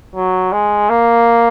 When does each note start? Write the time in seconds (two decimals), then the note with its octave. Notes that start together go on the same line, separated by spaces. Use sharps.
0.15 F#3
0.53 G#3
0.90 A#3